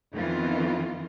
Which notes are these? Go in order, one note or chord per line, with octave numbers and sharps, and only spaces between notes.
F2 D#3 E3 B3 F4